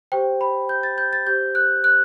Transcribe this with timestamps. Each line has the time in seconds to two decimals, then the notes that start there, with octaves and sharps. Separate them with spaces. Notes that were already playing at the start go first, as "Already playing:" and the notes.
0.12 G4 C5 G5
0.41 B5
0.69 G6
0.83 A6
0.98 G6
1.13 A6
1.27 G4 C5 G6
1.55 F#6
1.84 F#6